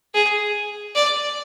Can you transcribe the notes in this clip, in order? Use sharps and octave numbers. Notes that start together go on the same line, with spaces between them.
G#4
D5